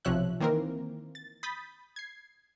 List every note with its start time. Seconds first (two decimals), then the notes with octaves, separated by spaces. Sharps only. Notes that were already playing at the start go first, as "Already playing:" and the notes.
0.05 B1 C3 F3 C#5 E5 F#6
0.40 D#3 E3 A#3 C4 A#4
1.15 A6
1.43 B5 D#6 G6 A6 B6
1.96 G#6 C7